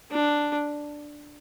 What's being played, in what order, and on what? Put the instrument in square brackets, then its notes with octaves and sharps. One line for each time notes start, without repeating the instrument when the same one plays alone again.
[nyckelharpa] D4